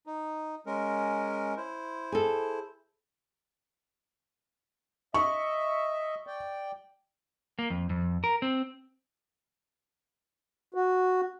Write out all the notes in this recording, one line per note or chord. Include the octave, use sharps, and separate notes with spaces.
D#4
G#3 C#4 A#4
E4 C5
G#4 A4
D#5 E5 C#6
D5 G5
A#3
F2
F2
A#4
C4
F#4